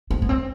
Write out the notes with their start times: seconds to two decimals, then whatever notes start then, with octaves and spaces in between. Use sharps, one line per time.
0.10 C4
0.22 B3
0.29 C4